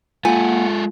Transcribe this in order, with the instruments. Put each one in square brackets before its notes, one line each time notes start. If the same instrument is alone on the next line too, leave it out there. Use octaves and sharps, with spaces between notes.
[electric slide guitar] G#3 A4 [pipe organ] A#3 F#5 [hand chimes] F4 [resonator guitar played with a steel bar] G#5